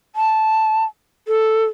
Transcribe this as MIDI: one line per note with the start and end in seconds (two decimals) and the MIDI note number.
0.16 0.84 81
1.28 1.65 69